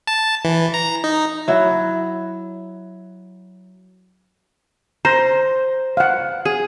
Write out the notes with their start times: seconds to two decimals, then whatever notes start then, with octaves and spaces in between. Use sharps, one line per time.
0.07 A5
0.45 E3
0.74 A#5
1.04 D#4
1.48 F#3 E4
5.05 C5 A#5
5.97 F5 F#5
6.45 G#4